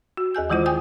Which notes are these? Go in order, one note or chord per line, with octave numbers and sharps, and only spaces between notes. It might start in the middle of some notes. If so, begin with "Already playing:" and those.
F#4
D#2 G#4 G#5 G6
D#3 E3 G#3 E4 F4 C5
G5 G#5 D#6 G6